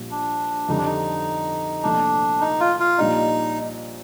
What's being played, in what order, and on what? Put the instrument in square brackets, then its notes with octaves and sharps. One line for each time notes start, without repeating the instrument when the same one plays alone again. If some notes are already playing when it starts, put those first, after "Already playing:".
Already playing: [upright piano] A#1 A#2 G3
[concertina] D4
[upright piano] F2 D3 G3 [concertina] D#4
[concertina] D4
D#4
[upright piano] C2 A#2 F3 A3 [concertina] D4
[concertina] D#4
F4
F4
[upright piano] A#1 A#2 G3 D4 [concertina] D#4